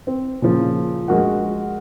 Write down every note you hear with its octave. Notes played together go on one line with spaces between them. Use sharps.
C4
A#2 C#3 F3
A#1 G#3 F#4 A#4 F#5